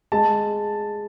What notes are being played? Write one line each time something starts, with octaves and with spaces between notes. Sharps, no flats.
G#3 A5